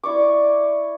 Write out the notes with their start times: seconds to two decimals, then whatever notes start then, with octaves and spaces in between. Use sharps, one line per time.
0.03 E4 D5 C#6 D6